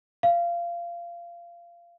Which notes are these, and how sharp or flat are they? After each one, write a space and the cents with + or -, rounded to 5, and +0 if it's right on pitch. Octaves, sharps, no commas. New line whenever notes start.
F5 -20